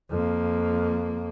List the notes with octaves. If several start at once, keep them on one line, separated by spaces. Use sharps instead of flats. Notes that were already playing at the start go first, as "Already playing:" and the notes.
F2 A#3